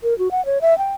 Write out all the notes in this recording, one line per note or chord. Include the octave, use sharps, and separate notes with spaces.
A#4
F#4
F#5
C#5
E5
G5